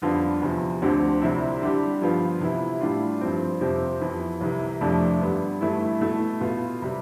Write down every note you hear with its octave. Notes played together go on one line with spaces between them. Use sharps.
F2 D3 G3 B3 F4
E2 C3 F3
D2 D3 F3 C4 G4
C2 C3 G3 C4 E4
D3 G3 D4 G4
G2 F3 B3 F4
C3 E3 B3 E4
A2 G3 D4 F4
G2 F3 C4
F2 C3 F3 C4 G4
F2 E3 B3
C2 C3 E3
F2 C3 F3 A3 D4
G2 D3 G3 B3
G2 E3 A3 E4
B2 A3 E4
B2 B3 F4
C3 G3